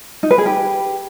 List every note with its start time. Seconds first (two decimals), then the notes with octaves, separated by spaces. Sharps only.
0.23 D#4
0.31 B4
0.38 G#4
0.46 G4